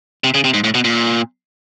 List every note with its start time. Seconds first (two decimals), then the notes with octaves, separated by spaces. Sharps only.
0.24 C3
0.34 C#3
0.44 C3
0.54 G#2
0.64 A2
0.74 B2
0.84 A#2